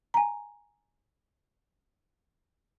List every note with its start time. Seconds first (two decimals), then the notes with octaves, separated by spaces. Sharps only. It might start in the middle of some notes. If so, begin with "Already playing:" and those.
0.14 G#5 A#5